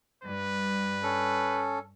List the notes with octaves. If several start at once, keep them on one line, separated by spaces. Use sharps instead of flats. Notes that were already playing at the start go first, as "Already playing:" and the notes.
G2 B4
C#4 A4